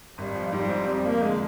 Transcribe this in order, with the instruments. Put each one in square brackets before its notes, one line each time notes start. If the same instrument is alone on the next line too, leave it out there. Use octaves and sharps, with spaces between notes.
[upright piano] G#1 [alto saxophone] G3
[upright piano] F3
[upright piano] G#2 [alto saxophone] G3
[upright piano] C4
[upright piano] F2 [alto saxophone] G3
[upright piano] F3 [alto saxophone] A#3
[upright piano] D3 [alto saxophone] G#3